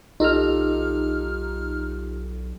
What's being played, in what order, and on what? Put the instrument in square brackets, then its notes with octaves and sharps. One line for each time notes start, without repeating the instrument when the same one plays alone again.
[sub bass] B1 [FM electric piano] D#4 F6 [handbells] F4 G4 A4